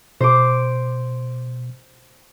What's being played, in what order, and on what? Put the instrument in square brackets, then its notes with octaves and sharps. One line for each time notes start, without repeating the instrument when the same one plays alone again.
[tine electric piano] B2 [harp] C5 D6